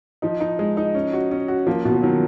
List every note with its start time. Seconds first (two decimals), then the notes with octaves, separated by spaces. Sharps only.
0.22 F3 D#4
0.40 D#4
0.59 G#3
0.77 D#4
0.95 C#4
1.13 F#4
1.31 C#4
1.48 F#4
1.67 F3 A#3
1.85 B2
1.92 F3
2.02 D#3 F#3